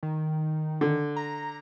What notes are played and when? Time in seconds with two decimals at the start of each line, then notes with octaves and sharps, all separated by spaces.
0.03 D#3
0.81 D3
1.16 A#5